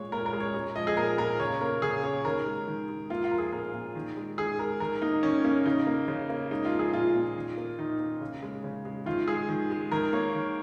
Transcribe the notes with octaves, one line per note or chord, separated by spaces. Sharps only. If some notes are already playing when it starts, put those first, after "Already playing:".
Already playing: A#2 G#3 C#5
A#2 A#4
A#4
G#3
C#5
G#3
F3 D#5
G#4
A#2 A#4
A#2 A#4
C#3 C#5
A#3 A#4
C#3 G#4
A#3 C#5
D#3 A#4
G#3
D#3
G#3
A#3 F4
F4
F3 A#4
G#4
A#2 A#4
A#2
D#3
G#3
D#3 G#4
G#3 A#4
D#3 A#4
A#3 D#4
D#3 C#4
A#3 C#4
C#3 D#4
A#3
C#3
A#3
G#3 D#4
F4
F3
G#4
A#2 F4
A#2
D#3
A#3
D#3 D#4
A#3
C#3
G#3
C#3
G#3
D#3 F4
G#3 G#4
D#3
G#3
D#3 A#4
A#3 C#5
D#3